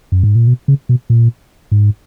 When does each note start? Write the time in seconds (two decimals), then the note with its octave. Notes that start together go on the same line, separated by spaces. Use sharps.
0.12 F#2
0.23 G#2
0.35 A#2
0.47 B2
0.68 C#3
0.89 B2
1.10 A#2
1.72 G#2